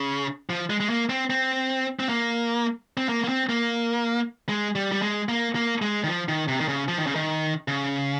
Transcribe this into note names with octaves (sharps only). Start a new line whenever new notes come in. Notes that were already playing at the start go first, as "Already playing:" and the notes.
Already playing: C#3
F3
G#3
G#3
A#3
C4
C4
C4
A#3
C4
A#3
A#3
C4
A#3
G#3
G3
G3
G#3
A#3
A#3
G#3
D#3
F3
D#3
C3
D#3
C#3
F3
D#3
C#3
D#3
C#3